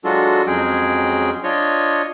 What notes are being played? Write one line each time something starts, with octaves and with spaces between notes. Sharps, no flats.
F#3 G#3 D4 F4 F#4 A4
F2 F#3 G#3 C#4 G#4 G5
D4 F4 C#5 D#5